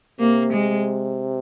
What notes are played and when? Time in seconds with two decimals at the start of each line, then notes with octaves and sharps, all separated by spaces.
0.20 C3 A#3
0.53 G#3